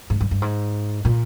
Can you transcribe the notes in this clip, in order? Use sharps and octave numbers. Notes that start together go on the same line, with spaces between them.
G#2
G2
G2
G#2
A#2